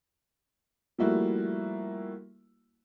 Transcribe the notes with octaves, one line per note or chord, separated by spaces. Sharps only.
F3 G3 A3 A#3 E4 F#4